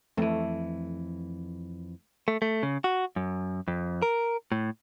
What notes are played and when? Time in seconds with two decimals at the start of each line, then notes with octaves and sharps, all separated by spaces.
0.17 F2 E3 A3
2.28 A3
2.42 A3
2.63 C#3
2.84 F#4
3.16 F#2
3.68 F2
4.02 A#4
4.52 A2